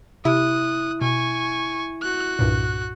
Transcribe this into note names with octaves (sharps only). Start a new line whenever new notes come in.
C3 E4 D#6 F#6
B2 G#5 C#6
F#4 F#6
C2 G2 A#2